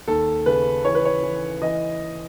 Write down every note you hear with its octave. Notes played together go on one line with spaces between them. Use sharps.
D#2 A4
C#3 B4
E3 C#5
B4
C#5
E3
E3 D#5